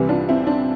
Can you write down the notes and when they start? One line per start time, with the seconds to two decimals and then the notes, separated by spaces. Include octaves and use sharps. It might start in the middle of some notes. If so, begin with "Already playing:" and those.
Already playing: C2 C3 E3 G3
0.09 D4 F4
0.29 C4 E4
0.47 D4